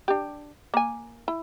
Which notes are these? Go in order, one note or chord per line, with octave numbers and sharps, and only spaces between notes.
D4 G4
A#3 G#5
E4